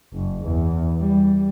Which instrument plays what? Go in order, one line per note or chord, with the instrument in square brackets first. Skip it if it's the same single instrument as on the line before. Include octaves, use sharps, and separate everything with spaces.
[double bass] F#1
E2
G3